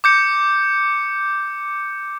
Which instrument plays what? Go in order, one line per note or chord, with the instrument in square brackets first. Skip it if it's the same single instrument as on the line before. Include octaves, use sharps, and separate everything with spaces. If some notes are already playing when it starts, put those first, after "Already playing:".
[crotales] D6 G6 C#7